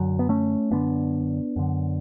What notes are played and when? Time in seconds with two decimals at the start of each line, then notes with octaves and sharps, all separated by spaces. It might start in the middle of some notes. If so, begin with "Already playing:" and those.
Already playing: F#2 D3 F#3
0.19 B3
0.29 A3 C#4
0.71 F#2 D3 B3 D4
1.56 F#2 D3